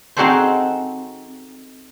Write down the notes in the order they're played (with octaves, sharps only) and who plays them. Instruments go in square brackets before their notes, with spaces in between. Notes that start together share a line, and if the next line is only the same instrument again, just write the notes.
[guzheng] C4 D#4 F#4 G#4 A4 C5